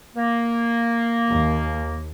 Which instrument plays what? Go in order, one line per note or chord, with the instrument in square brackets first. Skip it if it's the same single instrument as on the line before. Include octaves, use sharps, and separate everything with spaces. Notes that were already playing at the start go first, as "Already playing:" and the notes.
[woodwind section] A#3
[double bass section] D#2